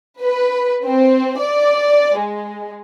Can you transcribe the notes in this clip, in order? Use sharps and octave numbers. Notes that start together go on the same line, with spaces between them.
B4
C4
D5
G#3